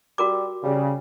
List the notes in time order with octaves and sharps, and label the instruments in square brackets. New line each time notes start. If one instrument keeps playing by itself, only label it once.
[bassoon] G3 [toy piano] F#4 A#4 D6
[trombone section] C#3 [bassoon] G3